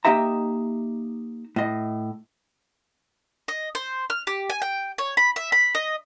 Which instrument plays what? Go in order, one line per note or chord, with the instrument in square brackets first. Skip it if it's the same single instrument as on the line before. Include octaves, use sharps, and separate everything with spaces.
[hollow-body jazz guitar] A#3 D#4 G4 D#5 E5 A#5
A2 D#5
[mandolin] D#5
C5
F6
G4
G#5
G5
C#5
B5
E5
B5
D#5